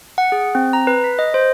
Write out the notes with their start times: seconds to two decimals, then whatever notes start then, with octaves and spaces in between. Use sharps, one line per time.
0.18 F#5
0.32 G#4
0.55 C4
0.73 A#5
0.87 B4
1.04 B6
1.19 D#5
1.34 C5